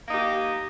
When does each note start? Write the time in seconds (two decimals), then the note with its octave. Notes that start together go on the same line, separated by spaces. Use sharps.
0.05 A#3
0.10 D#4
0.14 G4